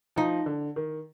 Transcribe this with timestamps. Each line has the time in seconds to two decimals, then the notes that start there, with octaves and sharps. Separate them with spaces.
0.16 F3 D#4
0.46 D3
0.76 D#3